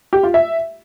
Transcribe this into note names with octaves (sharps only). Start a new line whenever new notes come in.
G4
F4
E5